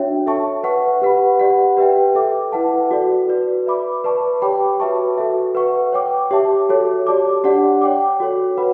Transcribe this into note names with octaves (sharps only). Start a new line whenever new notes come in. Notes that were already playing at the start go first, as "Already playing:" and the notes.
Already playing: D4 F#4 C#5 E5 G5
A4 E5 A5 C#6
B4 F#5 C#6
G4 B4 F#5 B5
G4 D5 F#5
G4 B4 E5 G5
A4 E5 G5 D6
E4 B4 F#5 A5
F#4 A4 D5
F#4 B4 D5
B4 E5 B5 D6
B4 D5 A5 C#6
G4 C#5 G5 B5 D6
F#4 B4 E5 A5 C#6
F#4 A4 E5
B4 F#5 C#6
C#5 G5 D6
G4 C#5 E5 A5 D6
F#4 A4 C#5
G4 D5 A5 D6
D4 G4 D5 F#5
C#5 G5 D6
F#4 A4 C#5
F#4 B4 F#5 B5